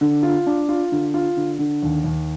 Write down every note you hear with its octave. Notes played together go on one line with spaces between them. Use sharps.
D3
F4
D4
F4
D3
F4
D3
D3
D#2
D#2